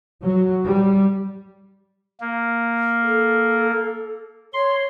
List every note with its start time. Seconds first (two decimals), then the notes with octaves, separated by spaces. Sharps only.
0.23 F#3
0.65 G3
2.20 A#3
3.03 A4
4.54 C#5 C6